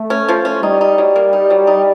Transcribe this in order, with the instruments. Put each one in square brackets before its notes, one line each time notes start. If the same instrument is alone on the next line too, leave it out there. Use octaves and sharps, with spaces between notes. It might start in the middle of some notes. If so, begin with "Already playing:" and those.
Already playing: [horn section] A3
[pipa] C#4
F3
C#4
[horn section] G3 [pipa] D#4
[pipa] D#4
F#3
A#3
D#4
F#3
D#4